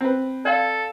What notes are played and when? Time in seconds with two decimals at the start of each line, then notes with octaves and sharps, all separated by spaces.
0.01 C4 B4
0.45 A4 D5 F5